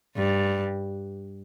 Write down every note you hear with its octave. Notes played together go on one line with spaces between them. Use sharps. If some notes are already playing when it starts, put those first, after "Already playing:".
G2